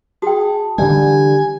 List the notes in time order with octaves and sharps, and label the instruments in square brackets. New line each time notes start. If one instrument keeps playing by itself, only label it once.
[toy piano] F#4 G5 [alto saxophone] G#4 [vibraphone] A5
[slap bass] D3 E3 G3 [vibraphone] G4 [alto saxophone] G#5